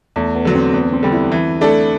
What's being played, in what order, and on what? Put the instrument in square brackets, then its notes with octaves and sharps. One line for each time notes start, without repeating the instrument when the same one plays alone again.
[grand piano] E2 [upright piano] A3
[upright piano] B3
[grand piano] D3 F#3
[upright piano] C4
[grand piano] E2 [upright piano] B3
[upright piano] C4
[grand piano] D3 G3
[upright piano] E4
[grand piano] E3
A3 D4 A4